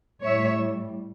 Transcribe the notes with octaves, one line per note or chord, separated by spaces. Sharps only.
A2 G3 C#5 E5